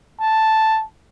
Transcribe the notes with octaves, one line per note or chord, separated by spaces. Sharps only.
A5